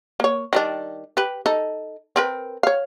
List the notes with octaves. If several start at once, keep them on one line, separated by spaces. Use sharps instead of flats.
A#3 C#5
D#3 G3 D4
G4 B4
D#4 A4
C4 A#4 B4
C#5 F5